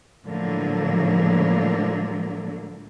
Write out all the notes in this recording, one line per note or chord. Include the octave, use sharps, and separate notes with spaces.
A2 D3 F3 F#3 G#3 A#3